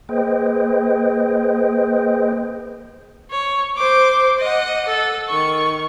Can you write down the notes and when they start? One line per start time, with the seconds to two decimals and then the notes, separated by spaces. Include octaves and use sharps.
0.09 A#3 G#4 B4 C5 D#5 G5
3.31 C#5
3.76 C5 D6
4.39 D#5 F#5
4.87 A4
5.28 D#3 C#6